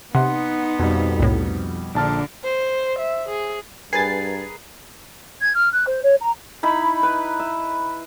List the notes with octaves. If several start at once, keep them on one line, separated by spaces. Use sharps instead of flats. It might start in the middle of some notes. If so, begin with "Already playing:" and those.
C3 B3 D#4 F#5 C6
F2 B2 G3
C2 A2
A#1 D3 D4 A5 F6
C5
E5
G#4
G2 G#4 A#4 B4 G#5 A6 C7
G#6
F6
F#6
C5
C#5
A#5
D#4 E4 B5
B4
E5